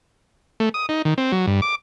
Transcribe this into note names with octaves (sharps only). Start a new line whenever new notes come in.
A3
D#6
D#4
D#3
C4
F#3
G2
D6